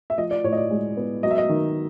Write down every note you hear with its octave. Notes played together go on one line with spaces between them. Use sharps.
E5
F3 D#5
D5
A2 C#5
D#5
D5
G#3
B3
F#3 D#5
E5
D#5
D#3